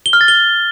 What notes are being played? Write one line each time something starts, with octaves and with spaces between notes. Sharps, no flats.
G7
F6
A6
G7